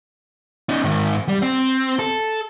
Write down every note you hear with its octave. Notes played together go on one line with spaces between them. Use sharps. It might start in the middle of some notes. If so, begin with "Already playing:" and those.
C#4 D#4
G#2 D#3
G3
C4
A4